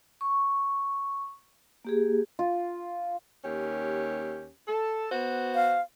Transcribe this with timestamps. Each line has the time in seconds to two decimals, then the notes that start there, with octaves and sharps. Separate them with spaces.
0.21 C#6
1.85 A#3 G4 G#4
2.39 F4
3.44 D#2 C#4 G4
4.67 A4
5.12 B3 F#4 C5
5.55 F5